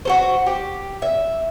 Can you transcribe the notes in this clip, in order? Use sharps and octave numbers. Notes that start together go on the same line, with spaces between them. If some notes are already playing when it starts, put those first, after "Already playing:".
F#4 A4 C5
G4
E5